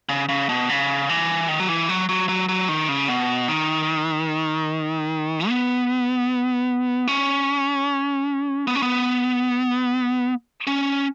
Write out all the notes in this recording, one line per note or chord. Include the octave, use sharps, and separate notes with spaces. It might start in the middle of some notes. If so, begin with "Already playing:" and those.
C#3
C#3
B2
C#3
E3
D#3
F#3
E3
F#3
F#3
F#3
F#3
D#3
C#3
B2
D#3
B3
C#4
B3
C#4
B3
C#4